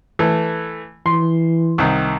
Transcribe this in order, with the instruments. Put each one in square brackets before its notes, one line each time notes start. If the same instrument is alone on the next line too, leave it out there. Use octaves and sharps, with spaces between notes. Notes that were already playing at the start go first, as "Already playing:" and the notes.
[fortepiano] E3 A3
[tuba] E3 [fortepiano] C6
[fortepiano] C2 D#3